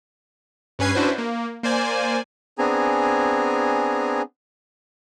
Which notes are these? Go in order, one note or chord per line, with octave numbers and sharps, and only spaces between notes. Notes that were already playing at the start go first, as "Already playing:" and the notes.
G2 C#4 B4 G#5 G#6 C7
C#4 D4 E4 F#4 B4 C5
A#3
A#3 C5 D5 G#5
B3 C4 D4 G#4 G#5 A#5